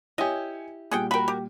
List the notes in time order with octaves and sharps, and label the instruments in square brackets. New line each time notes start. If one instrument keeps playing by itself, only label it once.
[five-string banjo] E4 G4 [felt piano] C#5 G#5 [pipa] D#5
[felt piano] A#2 G3 [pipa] G#4 F#5 G5
[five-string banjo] F#4 A#4 [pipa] G5 B5
[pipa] G4